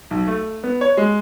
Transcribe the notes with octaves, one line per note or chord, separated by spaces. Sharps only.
B1
A3
B3
C#5
G#3